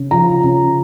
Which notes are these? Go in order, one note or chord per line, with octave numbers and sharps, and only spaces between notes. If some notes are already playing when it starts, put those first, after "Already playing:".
Already playing: C#3
F3 A#5
C#3